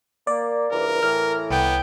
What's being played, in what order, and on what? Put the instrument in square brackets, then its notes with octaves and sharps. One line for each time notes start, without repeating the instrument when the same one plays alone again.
[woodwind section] A#3 [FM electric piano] D5
[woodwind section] C#2 G2 E3 [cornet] A#4
[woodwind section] A2 E3 [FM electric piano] F6
[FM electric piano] C2 [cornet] B3 [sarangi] G5